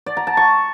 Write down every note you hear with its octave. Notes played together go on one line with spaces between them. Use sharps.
D5
A#5
A5
C#6